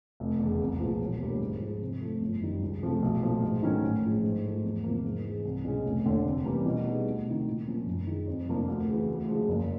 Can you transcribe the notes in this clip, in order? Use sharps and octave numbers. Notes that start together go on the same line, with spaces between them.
F1
E2 C#3
C2
A#2 F3 G#3 B3
E1
D#2 D3 G3 A#3
G#2
F3 G#3
C3
F3 A3
G1
F#2 D#3 G3
C#2
C3 F3 A3
B1
A#2 F3 A3
G#2
D#3 F#3 A3 C#4
A1
A2 F3 G#3 C#4
G#2
F3 A3
E2
C3 F3 A#3
G#2
E3 G#3
C2
B2 G#3 C#4
F1
D#2 D3
C3
E3 G3 A#3 C#4
B2
G3 B3 D#4 G#4
D2
C3 D#3
A#2
F3 A#3 C#4
F#2
D#3 G#3
F2
C3 F3 A#3 D4
D2
C#3 E3
D2
C#3 F3 G#3
F#1